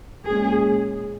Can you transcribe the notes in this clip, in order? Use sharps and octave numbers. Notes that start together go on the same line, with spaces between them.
A#2 G#3 C#4 G#4